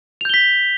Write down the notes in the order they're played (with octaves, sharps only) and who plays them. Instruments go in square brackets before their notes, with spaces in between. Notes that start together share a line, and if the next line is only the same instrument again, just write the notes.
[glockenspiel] F7
G6
G7
B6